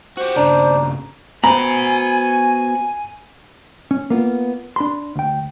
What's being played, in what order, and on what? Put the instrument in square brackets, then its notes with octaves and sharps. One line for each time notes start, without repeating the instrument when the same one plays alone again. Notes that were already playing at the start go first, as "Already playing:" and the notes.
[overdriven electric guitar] F#4 G4 [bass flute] C5
[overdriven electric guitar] G2 C#3 [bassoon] D4 [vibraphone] A#5
[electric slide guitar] B3 C5 [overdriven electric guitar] F#4 B5 [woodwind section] G#5 [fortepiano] A#5
[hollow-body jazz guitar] C#4
A#3 B3 F4
D4 B5 C6
D2 G5